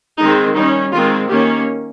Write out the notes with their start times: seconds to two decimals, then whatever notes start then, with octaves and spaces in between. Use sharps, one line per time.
0.18 D#3 G#3 C4 D#4
0.55 G3 C#4 D#4
0.92 D#3 G#3 C4 F4
1.29 D#3 A#3 C#4 G4